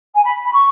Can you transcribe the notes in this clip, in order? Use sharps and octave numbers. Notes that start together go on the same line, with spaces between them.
G#5
B5
B5
C#6